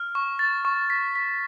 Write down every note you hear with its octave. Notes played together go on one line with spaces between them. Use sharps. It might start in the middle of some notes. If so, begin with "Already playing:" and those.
Already playing: F6
C#6
A6
C#6
B6
B6